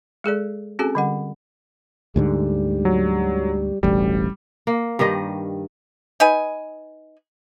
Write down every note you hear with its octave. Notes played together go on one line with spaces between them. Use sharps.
G#3 G#4 A4 D5
C4 C#4 F#4 G#4 A4 G#5
D3 G3 F#5
D2 G#2 D3 G3
F#3
E1 A1 D2 G3
A#3
G2 D#3 G3 D#5
D#4 B4 G#5